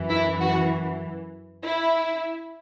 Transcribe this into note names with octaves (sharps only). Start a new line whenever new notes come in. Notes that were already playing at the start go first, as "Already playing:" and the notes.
Already playing: F#2 E3
E4
F#4
E4